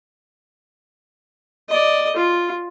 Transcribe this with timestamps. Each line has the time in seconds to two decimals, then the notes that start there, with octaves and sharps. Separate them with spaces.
1.69 D5 D#5
2.16 F4